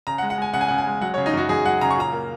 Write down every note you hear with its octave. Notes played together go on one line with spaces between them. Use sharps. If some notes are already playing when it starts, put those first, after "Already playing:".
C#3 A#5
F#5
G#3
F#5
G#3 G#5
C#3 F#5
G#5
C#3 F#5
G#5
G#3
F#3 F#5
C#5
C#3
D#4
F#2 F#4
F#2 G#4
F#3 F#5
C#3 A#5
C#6
A#2 A#5
A#3